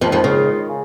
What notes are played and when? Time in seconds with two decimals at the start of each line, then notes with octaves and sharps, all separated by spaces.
0.01 F2 D#3 F3 G#3 F4
0.12 F2 F3
0.24 C#3
0.69 C#3